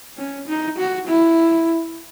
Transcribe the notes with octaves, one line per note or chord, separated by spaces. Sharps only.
C#4
D#4
F#4
E4